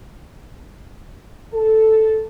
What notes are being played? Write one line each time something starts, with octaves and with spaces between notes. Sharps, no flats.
A4